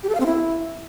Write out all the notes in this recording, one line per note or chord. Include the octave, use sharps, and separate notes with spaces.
G4
A4
F5
C4
E4